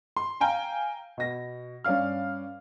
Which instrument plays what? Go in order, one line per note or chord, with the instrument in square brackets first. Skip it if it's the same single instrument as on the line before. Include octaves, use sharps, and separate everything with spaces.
[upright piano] C6
F5 G5 G#5 A#5
B2 A#6
G2 C#4 D5 F5 F6